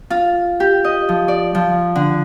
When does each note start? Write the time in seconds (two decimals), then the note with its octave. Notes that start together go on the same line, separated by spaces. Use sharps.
0.10 F4
0.60 G4
0.84 D#5
1.09 F3
1.28 D5
1.55 F3
1.95 D3